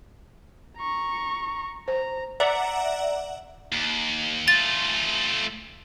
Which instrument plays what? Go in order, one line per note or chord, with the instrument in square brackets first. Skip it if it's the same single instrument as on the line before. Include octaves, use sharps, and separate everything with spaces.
[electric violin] A#5 C#6
[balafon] C5 [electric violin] A#5
[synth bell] D5 E5 F#5 A#5
[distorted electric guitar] D#2
[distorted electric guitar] A3 F4 [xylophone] A6